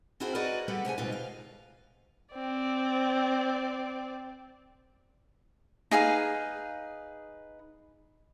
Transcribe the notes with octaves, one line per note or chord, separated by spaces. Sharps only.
C4 D4 E4 F#4 G#4 C5
F#4 G#4 A#4 B4 D5 D#5
G3 B3 G4 A4 B4 F#5
C3 A3 G#4 G#5
D2 G#2 B2 G3 F4 B4
F5
C4 D5
D#4 G#4 B4 F5